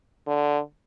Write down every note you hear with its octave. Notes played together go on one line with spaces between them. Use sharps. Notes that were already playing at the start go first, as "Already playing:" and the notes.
D3